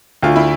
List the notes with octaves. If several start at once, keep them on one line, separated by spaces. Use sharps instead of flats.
D2 F4
E4